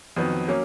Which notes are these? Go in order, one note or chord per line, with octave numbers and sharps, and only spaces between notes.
F2 D#3 F#3 B3
F#3 A#3 C#4